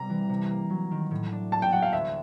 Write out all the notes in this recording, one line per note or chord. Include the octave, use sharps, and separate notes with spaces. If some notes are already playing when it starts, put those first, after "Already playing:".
Already playing: C3 G3 A#5
E3
C3
A#3
F#3
D#3
A2
D4
A#3 A5
G5
F#3 F#5
F5
D2 E5